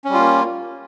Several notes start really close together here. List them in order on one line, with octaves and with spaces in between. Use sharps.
C#4 G3 F4 A#3